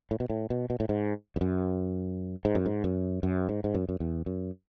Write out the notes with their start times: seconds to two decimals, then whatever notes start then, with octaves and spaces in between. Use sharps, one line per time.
0.11 A2
0.20 B2
0.30 A2
0.50 B2
0.70 B2
0.80 A2
0.89 G#2
1.36 E2
1.41 F#2
2.45 G#2
2.55 F#2
2.66 G#2
2.84 F#2
3.23 F#2
3.49 G#2
3.64 G#2
3.74 F#2
3.89 F#2
4.00 E2
4.26 F#2